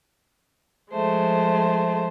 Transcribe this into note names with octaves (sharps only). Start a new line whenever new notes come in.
F3 G#3 A3 C5